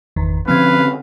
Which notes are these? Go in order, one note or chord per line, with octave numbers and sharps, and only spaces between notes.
G1 E2 D#3
D3 F3 C4 C#4 B4 F5 G#6